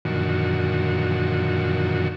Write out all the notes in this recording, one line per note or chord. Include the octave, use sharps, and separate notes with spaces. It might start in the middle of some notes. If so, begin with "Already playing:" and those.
F#2 A#2 D3 D#3 F3 F#4